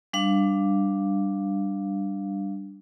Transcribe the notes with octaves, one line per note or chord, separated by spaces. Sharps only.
G3 D4 F5